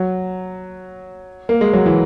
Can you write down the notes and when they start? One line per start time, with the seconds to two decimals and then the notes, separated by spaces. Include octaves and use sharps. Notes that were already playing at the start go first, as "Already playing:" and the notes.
Already playing: F#3
1.49 A#3
1.61 G#3
1.73 F#3
1.86 E3